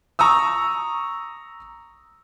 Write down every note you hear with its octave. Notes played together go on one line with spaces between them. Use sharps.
A#5 C#6 D#6 E6